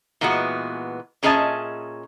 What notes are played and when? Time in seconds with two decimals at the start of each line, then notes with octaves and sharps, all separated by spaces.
0.21 A#2 E3 G#3 B3 E4 F#4
1.23 A#2 C#4 G#4 D#5 E5 A5